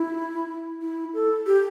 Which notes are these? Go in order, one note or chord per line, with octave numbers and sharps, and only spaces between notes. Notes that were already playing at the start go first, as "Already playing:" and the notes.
Already playing: E4
E4
A4
G4